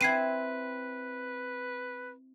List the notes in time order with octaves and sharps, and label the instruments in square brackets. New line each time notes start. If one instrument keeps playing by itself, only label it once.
[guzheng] C4 E4 [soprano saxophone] B4 [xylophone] G#6 C7 D#7